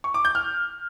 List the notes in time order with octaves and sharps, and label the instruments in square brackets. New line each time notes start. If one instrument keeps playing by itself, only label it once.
[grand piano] C#6
D6
G6
F6